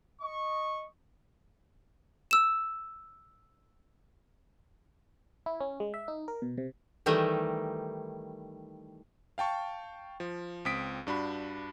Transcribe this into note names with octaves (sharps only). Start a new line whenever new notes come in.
D#5 C#6
E6 E7
E4
C#4
G#3
E5
D#4
A#4
B2
C3
D#3 E3 G3 A3 D#4
F5 G5 A5 C#6
F3
C#2 C4 D#6 B6 D7
G2 D4 F#4 B5